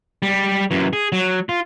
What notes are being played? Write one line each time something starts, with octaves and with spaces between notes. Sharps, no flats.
G3
F#2 E3
G#4
F#3
F4